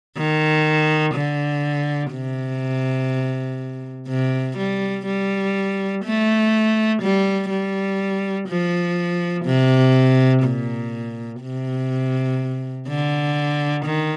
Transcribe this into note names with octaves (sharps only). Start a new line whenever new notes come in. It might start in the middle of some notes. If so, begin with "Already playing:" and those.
D#3
D3
C3
C3
G3
G3
A3
G3
G3
F3
C3
A#2
C3
D3
D#3